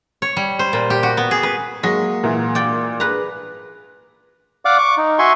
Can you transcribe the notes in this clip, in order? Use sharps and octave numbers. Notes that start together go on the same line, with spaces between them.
C#5
G3
C5
A#2
G4
F#4
B3
G#4
B4
F#3 G#3 A#3 A#6
A#2 E3
D5 G5
G#4 B4 A#5
D5 F5 F#5 D6
C#6 D6
D#4
F#4 E5 G#5 C6 C#6